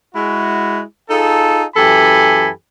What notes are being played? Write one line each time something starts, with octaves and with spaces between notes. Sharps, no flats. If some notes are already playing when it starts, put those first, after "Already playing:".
G#3 E4 F#4
D#4 F4 G#4 A4
F#2 E3 G4 A4 G#5 B5